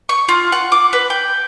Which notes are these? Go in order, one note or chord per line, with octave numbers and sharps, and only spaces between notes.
C#6
F4
F#5
D6
B4
G5